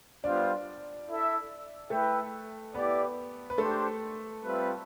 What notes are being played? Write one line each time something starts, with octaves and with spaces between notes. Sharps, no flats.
G3 B3 D4 F4 C5 D5
E4 A4 E5
A3 E4 A4 B4 E5 G5
B3 E4 G4 B4 D5
B4
A3 D4 G4 A4 C5
G3 C4 F4 B4 E5